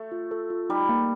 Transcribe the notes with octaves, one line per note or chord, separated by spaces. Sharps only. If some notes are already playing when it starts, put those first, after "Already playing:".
Already playing: A3
F4
A4
F4
G3 D#4
A#3